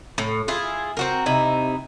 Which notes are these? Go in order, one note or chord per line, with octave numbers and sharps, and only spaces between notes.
A2
E4 F4 G#4
C4 F#4 A#4
C3 D#4 E4